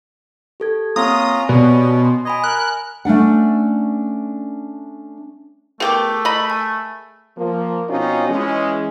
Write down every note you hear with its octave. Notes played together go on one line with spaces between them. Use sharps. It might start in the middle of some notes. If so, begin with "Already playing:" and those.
G4 A4 G#6
A#3 C4 C#4 F4 A#5 D#6
B2 C#4 G4 D5
C6
D#5 G#5 B5 G#6
A#4 F#6
A3 C#4 D4 F#5
B2 A3 G4 G#4 A#4 D6
D#5 A#5 B5
G#5
F3 A#3
B2 C4 C#4 D#4 F4 F#4
E3 G#3 C#4